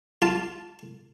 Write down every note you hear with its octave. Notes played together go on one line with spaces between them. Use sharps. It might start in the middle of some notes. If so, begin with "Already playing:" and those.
F4 A5